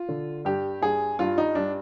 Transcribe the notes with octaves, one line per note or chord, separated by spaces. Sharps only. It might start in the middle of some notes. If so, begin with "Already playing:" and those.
Already playing: F4
D3
G2 G4
G2 G#4
G2 F4
D#4
G2 D4